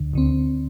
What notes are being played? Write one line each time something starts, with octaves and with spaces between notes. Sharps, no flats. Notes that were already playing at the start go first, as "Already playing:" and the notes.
Already playing: D2 D3
D2 D3 C4